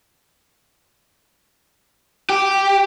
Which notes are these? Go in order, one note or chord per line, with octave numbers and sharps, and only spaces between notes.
G4